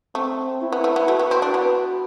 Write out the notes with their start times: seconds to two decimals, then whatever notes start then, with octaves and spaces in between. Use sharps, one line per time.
0.15 A3 C4
0.62 E4
0.72 B3
0.84 A3
0.96 B3
1.08 A3 F#4
1.19 B3
1.31 C4
1.42 D4
1.54 B3